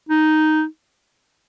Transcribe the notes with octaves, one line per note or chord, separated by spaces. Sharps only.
D#4